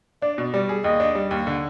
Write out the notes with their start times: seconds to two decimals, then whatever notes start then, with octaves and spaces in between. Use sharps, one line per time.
0.22 D4 D5
0.38 B2
0.54 G3 D5
0.69 G#4
0.84 D#2 D#5
1.00 D4
1.15 G3
1.31 D#2
1.47 D3